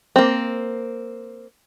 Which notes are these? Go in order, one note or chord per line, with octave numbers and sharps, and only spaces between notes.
A#3 C4